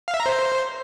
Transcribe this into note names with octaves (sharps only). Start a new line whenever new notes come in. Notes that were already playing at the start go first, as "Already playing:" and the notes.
F5
E5
A#5
C5